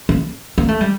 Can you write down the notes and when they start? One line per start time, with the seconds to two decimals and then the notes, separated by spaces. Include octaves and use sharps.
0.09 A#3
0.58 A#3
0.68 A3
0.81 G3